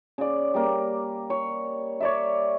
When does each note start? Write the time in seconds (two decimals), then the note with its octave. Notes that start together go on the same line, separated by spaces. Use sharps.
0.18 C#3 D5
0.54 G3 A#3
1.30 C#5
2.00 C#5 D5 E5